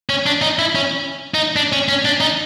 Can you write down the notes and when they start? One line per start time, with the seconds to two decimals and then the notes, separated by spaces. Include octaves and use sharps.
0.09 C#4
0.26 D4
0.42 D#4
0.59 E4
0.75 C#4
1.34 D#4
1.56 D4
1.73 C#4
1.89 C#4
2.05 D4
2.21 D#4